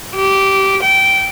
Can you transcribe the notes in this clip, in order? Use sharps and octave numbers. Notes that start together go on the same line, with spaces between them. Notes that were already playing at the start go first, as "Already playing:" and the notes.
G4
G5